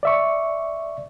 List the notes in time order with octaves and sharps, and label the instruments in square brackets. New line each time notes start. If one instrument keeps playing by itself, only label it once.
[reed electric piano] D5 E5 C#6